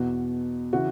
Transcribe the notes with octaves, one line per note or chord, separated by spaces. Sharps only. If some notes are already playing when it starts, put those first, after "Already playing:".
Already playing: E2 B2 F#4
C#3 E3 F#4